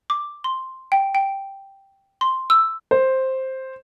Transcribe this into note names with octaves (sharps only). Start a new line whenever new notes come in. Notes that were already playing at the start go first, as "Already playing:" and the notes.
D6
C6
G5
G5
C6
E6
C5